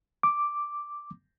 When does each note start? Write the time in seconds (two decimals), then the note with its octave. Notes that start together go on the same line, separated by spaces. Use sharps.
0.23 D6